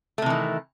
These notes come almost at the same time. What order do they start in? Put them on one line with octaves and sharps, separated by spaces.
A3 C3 E3 D#3